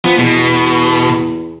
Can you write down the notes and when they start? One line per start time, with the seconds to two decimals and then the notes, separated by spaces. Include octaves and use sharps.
0.05 F3 B3
0.19 E2 B2